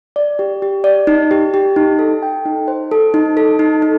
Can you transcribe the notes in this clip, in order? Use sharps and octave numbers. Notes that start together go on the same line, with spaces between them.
D5
G4
G4
D5
D#4
G4
G4
D#4
A4
G5
D#4
C5
A4
D#4
A4
D#4
D#4